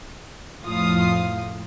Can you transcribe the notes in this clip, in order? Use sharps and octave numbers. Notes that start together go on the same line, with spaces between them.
F2 A2 F3 F4 F5 D#6